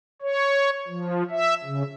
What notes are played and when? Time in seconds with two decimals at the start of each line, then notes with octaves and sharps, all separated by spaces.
0.22 C#5
0.88 F3
1.30 E5
1.64 C#3